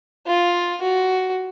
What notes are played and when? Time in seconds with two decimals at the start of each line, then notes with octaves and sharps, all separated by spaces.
0.27 F4
0.82 F#4